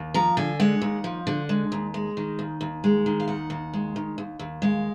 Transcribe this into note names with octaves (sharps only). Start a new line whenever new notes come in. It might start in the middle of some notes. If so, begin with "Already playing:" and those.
Already playing: D#2
F3 A#5
D3 G#5
G#3 F#5
D#2
F3
D3
G#3
D#2
G#3
D#3
D#2
D#2
G#3
D#3
F5
D#2 F#5
D#2
G#3
D#3
D#2
D#2
G#3 F5